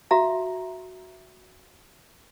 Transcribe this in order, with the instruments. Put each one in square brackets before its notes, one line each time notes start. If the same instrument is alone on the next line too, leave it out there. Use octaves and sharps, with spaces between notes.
[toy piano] F#4 E5 F5 A#5